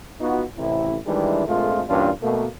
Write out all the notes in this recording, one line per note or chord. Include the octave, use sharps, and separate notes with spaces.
B3 D#4 F4 F#4
A1 C3 E4
D#3 E3 G3 G#3 D4 E4
A#1 F2 A#2 G#3 A3 F4
G2 A#2 E3 C#4 D4 F4
B2 A3 A#3